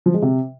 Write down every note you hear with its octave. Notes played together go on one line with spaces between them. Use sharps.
F3
G#3
C3